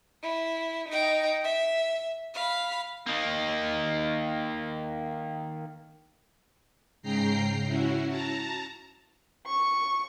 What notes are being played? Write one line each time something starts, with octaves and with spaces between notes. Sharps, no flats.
E4
D#4 G5
E5
F5 B5
D#3 A#3
G#2 C#3 G5 A#5 C7
C#4 E4 F#4
A5 A#5
C#6